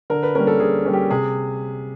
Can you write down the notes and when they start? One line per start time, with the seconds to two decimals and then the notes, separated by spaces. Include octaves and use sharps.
0.10 D3 A#4
0.23 B4
0.35 G3 A#3 C#4 A#4
0.47 A4
0.60 D3 G#4
0.85 G3 A#3 C#4
0.93 G4
1.10 C3 G#4